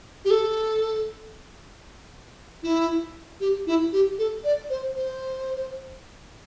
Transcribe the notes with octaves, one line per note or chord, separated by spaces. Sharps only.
G4
A4
E4
G4
E4
G4
A4
D5
C5
C5